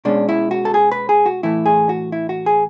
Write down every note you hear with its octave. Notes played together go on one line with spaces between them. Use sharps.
B2 G#3 C#4 D4
E4
F#4
A4
G#4
B4
G#4
F#4
A2 E3 A3 E4
G#4
F#4
E4
F#4
G#4